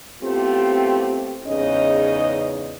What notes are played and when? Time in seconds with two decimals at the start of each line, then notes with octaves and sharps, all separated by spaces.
0.22 A3 B3 C4 E4 F4 G4
1.46 E2 G#2 C#3 C#4 D#4 D#5